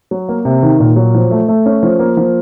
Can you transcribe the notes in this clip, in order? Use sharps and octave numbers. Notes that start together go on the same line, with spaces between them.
F#3
A#3
C3
D#3
A#2
F#3
F3
A3
A3
C#4
F3
A#3
F3